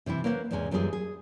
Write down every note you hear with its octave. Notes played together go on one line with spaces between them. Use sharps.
C3 E3 C4 E4
A#3 C#4 B4 C5 D#5 F#5
E2 G#2 C3 G#3 C#4 G#5
F#2 E3 G3 F4 G#4
G#4